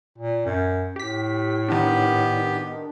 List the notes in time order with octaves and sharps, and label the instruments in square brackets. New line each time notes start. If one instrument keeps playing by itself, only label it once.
[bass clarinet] A#2
F#2
[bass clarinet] A2 [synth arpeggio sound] G4 B6
[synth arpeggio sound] D#3 D4 [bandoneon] B3 G4